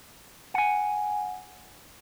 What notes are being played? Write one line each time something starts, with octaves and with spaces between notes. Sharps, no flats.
F#5 G#5